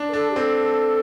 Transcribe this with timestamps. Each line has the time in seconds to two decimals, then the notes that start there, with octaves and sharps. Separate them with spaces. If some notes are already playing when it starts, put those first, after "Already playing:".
Already playing: D4
0.09 A#4
0.13 D4 A4
0.31 G4
0.36 C4 A4